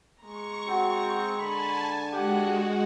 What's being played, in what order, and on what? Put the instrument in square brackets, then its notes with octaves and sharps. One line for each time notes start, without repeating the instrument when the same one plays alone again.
[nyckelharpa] G#3 A#5 [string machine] C#6
[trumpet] C4 [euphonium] F#4
[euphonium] D3 [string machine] G#5 A5 [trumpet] B5
[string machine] G#3 F#4 [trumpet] G4 [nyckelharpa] F#5